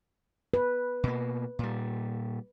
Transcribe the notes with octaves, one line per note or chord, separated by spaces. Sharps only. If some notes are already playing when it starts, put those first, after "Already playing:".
B4
B2 A#3
A#2 G3